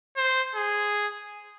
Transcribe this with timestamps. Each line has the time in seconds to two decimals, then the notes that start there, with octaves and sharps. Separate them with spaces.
0.17 C5
0.55 G#4